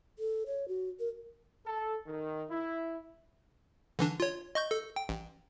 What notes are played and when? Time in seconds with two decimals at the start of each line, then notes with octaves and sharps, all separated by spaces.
0.19 A4
0.46 C#5
0.68 F#4
1.00 A#4
1.66 A4
2.06 D#3
2.50 E4
3.99 D3 E3 D4
4.20 F4 C#5
4.55 D#5 C#6 G6
4.71 A4
4.96 G5
5.09 A1